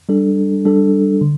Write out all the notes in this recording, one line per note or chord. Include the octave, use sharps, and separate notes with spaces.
G3 D4 A4
G3 D4 A4
D3